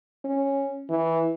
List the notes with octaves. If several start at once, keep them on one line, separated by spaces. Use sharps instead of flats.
C#4
E3